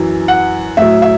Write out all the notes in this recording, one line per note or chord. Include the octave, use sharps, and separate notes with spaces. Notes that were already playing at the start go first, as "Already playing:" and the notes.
Already playing: F#2 E3
F#5
A2 F#3 E5
E5